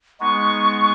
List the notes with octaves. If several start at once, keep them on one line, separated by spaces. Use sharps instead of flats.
G#3 B3 D#4 C#6